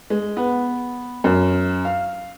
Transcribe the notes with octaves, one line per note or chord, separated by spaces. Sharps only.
G#3
B3
F#2
F5